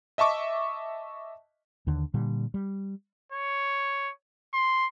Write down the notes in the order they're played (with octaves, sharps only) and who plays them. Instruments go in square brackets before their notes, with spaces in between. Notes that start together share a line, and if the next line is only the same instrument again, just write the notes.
[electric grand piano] D#5 E5 A5 C#6 D6
[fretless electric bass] D#2 D3
A#2 D3 G3
G3
[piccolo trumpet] C#5
C6